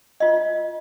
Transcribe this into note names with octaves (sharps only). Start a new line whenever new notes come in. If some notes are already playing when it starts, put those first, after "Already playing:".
F4 D#5